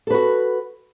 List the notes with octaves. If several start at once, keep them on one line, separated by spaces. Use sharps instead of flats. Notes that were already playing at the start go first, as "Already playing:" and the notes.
F#4 A4 B4